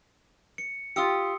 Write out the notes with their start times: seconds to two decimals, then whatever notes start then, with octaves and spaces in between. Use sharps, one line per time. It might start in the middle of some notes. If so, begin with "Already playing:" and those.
0.58 C#7
0.96 F4 G4 D#6 E6 C#7